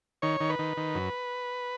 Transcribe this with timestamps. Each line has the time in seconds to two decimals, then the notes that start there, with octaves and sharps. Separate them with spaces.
0.22 D#3 C#5
0.40 D#3
0.49 B4
0.59 D#3
0.77 D#3
0.95 F#2